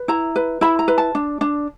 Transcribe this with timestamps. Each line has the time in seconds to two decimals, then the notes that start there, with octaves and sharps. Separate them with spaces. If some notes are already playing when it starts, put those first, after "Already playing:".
Already playing: B4
0.08 E4 A#5
0.36 B4
0.61 E4 B5
0.79 A#5
0.88 B4
0.98 A5
1.15 D4
1.41 D4